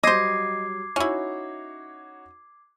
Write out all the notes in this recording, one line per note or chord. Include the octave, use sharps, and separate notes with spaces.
F#3 G3 C5 D#5 D6 G#6 C7
C#4 D#4 E4 F#4 C#5